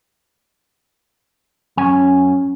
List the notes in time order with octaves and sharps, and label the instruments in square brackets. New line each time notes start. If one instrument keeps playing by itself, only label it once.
[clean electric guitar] F#2 G#5 [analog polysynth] C#4